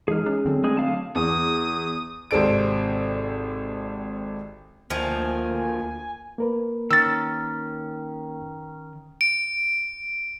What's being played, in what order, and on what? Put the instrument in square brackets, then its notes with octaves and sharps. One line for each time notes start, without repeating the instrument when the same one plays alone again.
[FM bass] E3 [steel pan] G#3 D#4 [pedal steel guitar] G#4 F6
[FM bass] C#4
[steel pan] D3 F#3 A4 [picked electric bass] C4
[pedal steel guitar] G#3 G#4 [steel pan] A3 [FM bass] D4
[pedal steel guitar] D3 F5 A5 [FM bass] F#3
[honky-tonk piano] E2 [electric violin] D#6
[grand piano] G#1 C3 C4 A4 D5 D7
[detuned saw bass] D2 [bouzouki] D#3 F3 [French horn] A#3 [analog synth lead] G#5
[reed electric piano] A#3 A#4 B4
[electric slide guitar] D#3 C#4 [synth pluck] E6 A6
[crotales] D7